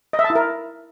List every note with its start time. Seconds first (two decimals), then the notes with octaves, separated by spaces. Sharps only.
0.13 D#5
0.19 E5
0.24 A5
0.30 E4
0.35 A#4